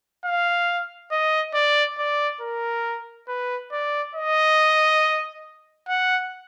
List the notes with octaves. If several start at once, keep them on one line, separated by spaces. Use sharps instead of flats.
F5
D#5
D5
D5
A#4
B4
D5
D#5
F#5